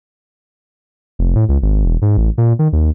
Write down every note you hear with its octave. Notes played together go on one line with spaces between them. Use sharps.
F1
A2
C#2
G#1
E1
G#2
A1
A#2
D#3
D#2